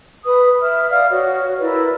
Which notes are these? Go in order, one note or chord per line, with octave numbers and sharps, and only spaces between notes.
B4 D#6
E5 F6
D5 F5 D#6 F6
F#4 C#5
E4 A#4 B4 D5